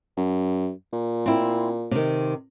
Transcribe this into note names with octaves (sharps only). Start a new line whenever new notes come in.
F#2
A#2
C4 E4
C3 D#3